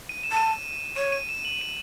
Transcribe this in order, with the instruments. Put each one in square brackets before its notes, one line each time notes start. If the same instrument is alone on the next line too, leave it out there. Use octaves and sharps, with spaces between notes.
[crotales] D#7
E7
[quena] A5 [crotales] D#7
[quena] C#5 [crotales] D#7
[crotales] D#7
E7
F#7
D#7